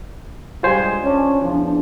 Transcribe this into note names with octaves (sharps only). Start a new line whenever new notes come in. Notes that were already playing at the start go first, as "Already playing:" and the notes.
G2 G3 G#3 F4 C5 G#5
C#4 D4
E2 F3 D4